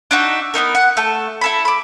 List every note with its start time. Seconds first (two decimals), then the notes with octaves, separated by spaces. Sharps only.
0.11 D4 D#4 F#4 E5
0.54 B3 C4 D#4 A#4
0.75 F#5
0.97 A3 A5
1.41 E4 A4 B5
1.65 B5 D6